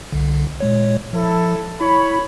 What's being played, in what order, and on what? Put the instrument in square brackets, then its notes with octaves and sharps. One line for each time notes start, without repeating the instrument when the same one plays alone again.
[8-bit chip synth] C2 D3
A#2 G#3 C#5
[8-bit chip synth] F3 [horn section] E4 A4
[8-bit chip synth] E4 [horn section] C#5 B5